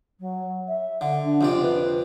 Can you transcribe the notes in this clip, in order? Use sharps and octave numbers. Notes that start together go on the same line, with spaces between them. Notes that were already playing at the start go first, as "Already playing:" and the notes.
F#3
E5
D3
D4
F2 C3 F4 D5
B4